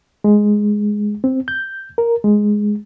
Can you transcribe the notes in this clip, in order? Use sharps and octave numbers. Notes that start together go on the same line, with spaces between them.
G#3
C4
G6
A#4
G#3